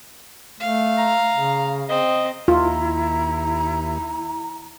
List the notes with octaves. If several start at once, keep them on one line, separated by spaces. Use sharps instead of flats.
A3 F5
A#5
C#3
C4 D#5
D#2 E4 F4 A#5